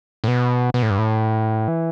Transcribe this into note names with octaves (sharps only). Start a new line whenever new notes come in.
A2
B2
B2
A2
G2
A2
E3